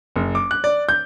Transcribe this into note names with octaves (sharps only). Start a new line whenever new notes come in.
F#1
D6
F#6
D5
G6